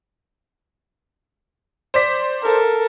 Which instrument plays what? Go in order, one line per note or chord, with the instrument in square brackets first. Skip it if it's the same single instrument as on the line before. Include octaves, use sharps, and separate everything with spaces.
[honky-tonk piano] C5 D5 B6
[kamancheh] A4 A#4